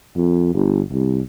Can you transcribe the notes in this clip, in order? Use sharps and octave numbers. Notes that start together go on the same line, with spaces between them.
F2
G1
C2